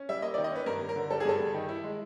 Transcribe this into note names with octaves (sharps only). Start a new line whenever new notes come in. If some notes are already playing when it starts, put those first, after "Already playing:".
Already playing: C#4
G3 E5
A#3 D#5
D5
D#3
D#5
C#4 B4
G2 A#4
G2
A#4
D3
G3 A4
G#4
G2 A4
G2
D#3
E4
G#3